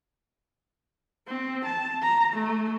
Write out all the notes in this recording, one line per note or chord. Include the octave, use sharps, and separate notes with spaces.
C4
A5
A#5
A3